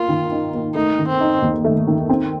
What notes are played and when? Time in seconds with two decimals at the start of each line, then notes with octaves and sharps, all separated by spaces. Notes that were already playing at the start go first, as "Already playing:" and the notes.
Already playing: A#3 F4 A#4
0.09 D#3
0.32 D#4
0.54 A#3
0.75 A3 D#4
0.98 D#3
1.09 C4
1.20 D#4
1.42 D#2
1.64 A3
1.87 D#3
2.09 C4